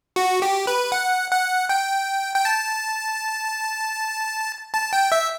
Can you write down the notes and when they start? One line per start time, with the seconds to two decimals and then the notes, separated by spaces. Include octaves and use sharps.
0.16 F#4
0.42 G4
0.67 B4
0.92 F#5
1.31 F#5
1.69 G5
2.35 G5
2.45 A5
4.74 A5
4.93 G5
5.12 E5